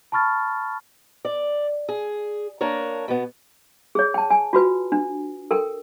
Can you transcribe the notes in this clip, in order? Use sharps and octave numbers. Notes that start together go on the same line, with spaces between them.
A5 B5 C#6 F6 A6
D5
G#4
A#3 D4 A#4 C#5
B2 B3
G#4 C#5
G5 A5
G#5
F4 F#4 B4
D4
A4 A#4 G5